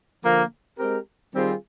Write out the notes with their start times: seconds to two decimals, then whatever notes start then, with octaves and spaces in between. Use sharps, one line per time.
0.24 D3 F3 A#3
0.79 G#3 C4 G4 A#4
1.33 D#3 G3 C4 F4 G#4